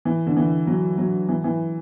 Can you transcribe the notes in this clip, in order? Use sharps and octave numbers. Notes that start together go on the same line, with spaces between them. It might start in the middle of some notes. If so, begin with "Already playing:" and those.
E3
D3
E3
F#3
F#3
E3
E3